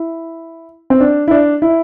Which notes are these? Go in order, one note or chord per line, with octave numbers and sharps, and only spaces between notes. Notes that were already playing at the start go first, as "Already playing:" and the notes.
Already playing: E4
C4
D4
E4
D4
E4